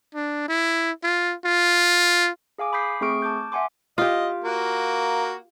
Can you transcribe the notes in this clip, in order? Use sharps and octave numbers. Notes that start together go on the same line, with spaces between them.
D4
E4
F4
F4
G#4 F5 G#5 D6
B5 D6 D#6 G6 B6 C7
A3 C4 G#4 C#6 F6 D7
A5 D6 G6
E5 F#5 G#5 C6 D6
F4 G4 D#5
A#3 F#4